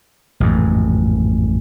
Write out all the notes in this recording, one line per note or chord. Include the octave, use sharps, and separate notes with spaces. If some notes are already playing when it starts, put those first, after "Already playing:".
A1 F2 G#2